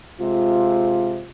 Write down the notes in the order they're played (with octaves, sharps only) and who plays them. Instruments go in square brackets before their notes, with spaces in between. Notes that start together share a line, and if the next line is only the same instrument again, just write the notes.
[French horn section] C3 G#3 F4